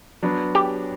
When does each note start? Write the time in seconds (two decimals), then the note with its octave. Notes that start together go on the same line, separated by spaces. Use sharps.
0.23 F#3 B3 D4
0.55 G4